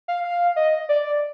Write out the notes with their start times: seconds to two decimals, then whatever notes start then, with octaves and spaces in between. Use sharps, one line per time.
0.08 F5
0.24 F5
0.56 D#5
0.89 D5